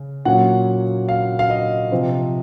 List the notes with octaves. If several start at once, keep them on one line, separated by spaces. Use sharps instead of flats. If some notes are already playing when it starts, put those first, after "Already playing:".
Already playing: C#3
A#2 F#3 A#3 C#4 F#5
F5
F5
D#5
C3 F3 C4